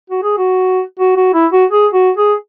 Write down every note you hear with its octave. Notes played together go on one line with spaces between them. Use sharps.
F#4
G#4
F#4
F#4
F#4
E4
F#4
G#4
F#4
G#4